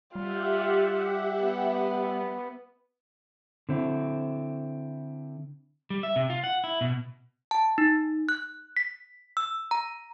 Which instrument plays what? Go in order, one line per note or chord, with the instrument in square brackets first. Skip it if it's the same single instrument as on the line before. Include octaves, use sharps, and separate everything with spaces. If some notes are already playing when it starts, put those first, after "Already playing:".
[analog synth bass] G3 [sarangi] F4 [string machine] G4 E5 F#5
[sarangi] B3
[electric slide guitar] D3 C4 E4
[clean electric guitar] G3
E5
C3
F4
F#5
E4
B2
[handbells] A5
D#4
F#6
B6
E6
A#5